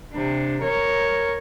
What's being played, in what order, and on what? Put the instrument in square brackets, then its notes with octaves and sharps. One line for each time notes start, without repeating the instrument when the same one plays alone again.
[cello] C3 D4
A#4 C#5